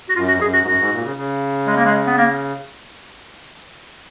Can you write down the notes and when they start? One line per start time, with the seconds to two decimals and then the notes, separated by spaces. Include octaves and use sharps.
0.09 F#4
0.16 F#2 F4
0.28 F#4
0.34 F2
0.41 F#2 G#4
0.54 F#4
0.61 G#2
0.66 F#2 F#4
0.79 G#2
0.92 A#2
1.03 C#3
1.16 C#3
1.67 G#3
1.76 A#3
1.85 G#3
2.06 B3
2.17 A#3